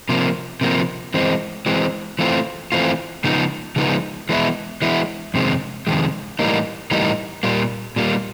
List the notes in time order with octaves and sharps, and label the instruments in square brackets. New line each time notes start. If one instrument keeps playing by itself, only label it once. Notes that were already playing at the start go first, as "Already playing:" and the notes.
[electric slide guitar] C3 F3 A#3
C3 F3 A#3
E3 G#3 C4
E3 G#3 C4
E3 A3 C4 F4
E3 A3 C4 F4
C#3 F3 G#3 B3 D#4
C#3 F3 G#3 B3 D#4
E3 G#3 B3 E4
E3 G#3 B3 E4
F2 C3 D#3 G#3
F2 C3 D#3 G#3
A2 E3 G3 A#3 D#4
A2 E3 G3 A#3 D#4
A#2 G3 A#3
A#2 G3 A#3